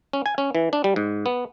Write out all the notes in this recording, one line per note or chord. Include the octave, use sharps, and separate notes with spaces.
C#4
G#5
C#4
E3
D4
G3
G#2
B3